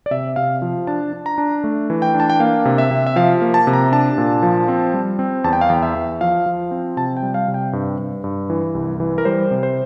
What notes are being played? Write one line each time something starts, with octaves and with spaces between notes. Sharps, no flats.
D5
C3 E5
C3 F5
F3
D4 A5
D4
A#5
D4
A3
E3
G5
D4
A5
G5
A#3 F5
C3
E5
C3
E5
F3 F5
A#3
A5
C3
A#5
D4 A5
A#2
F3
C4
G3
C4
E2 A5
G5
F5
E2 G5
E5
E2
F3 F5
F3
C4
C3 A5
G5
G3
F5
C3
G5
G2
G2
G2
E3
C2
E3
A#4
G3 C5
C3
C5